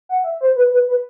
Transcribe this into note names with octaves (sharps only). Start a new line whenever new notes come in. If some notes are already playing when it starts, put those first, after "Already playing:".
F#5
E5
C5
B4
B4
B4